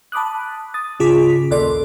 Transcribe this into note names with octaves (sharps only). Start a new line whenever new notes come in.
A5 B5 D6 D#6 F#6
D#6 A6
G#1 C#3 F4 G#4 D6 B6
A#1 D#2 A4 D5 C6 D6